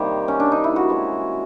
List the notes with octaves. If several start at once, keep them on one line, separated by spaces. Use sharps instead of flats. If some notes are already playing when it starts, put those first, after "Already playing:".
Already playing: C3 D#3 G3 A#3 G4
C#4
D4
D#4
E4
F#4
E3 G#3 C#4